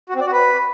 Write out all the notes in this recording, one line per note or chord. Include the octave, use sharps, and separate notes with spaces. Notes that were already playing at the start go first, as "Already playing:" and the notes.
F#4
C4
D5
F#4
B4